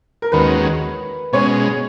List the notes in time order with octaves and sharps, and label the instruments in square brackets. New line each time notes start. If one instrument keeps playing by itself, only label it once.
[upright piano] A#4
[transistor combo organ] D#2 D#3 G#3 C#4 F#4 [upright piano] B4
[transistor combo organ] B2 G#3 C#4 [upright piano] C#5